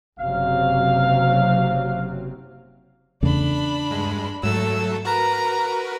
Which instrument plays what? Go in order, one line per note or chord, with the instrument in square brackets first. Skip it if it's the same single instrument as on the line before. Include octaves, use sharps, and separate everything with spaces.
[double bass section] F#1 C3 F#3 [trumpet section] F5
[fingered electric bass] E2 C#3 A3 [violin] D4 B5
[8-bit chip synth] G2 G#3
[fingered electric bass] G#2 [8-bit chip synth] F#3 A3 A4 [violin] E6
[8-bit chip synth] F#4 A#4 B4 [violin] A#5